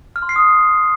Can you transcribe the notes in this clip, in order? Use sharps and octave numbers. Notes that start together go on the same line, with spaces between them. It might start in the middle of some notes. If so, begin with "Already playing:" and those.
F6
C6
C7
D#6